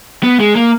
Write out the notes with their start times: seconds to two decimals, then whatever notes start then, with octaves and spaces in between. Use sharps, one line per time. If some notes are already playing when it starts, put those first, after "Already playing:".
0.23 B3
0.40 G#3
0.56 A#3